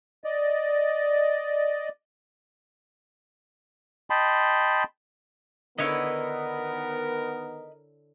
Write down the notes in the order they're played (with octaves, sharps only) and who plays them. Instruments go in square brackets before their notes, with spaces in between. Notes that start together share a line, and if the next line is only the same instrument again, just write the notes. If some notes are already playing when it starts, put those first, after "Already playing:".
[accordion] D5 D#5
[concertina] D#5 G5 A5 B5 C6
[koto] D3 E4 C#5 [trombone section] D#3 B3 [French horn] A#4 [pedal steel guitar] B4 D#5